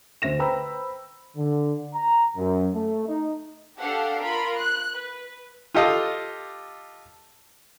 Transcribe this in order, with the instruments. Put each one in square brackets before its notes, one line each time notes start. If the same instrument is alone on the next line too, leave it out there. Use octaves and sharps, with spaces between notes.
[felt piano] D2 C5 E5 A#6 E7
B4 C5 G5 A#5 B5 E6
[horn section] D3
A#5
F#2
A3
D#4
[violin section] D4 G4 A4 F5 F#5
F4 A#4 B5
F#6
B4
[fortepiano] F4 G4 A4 D#5 F5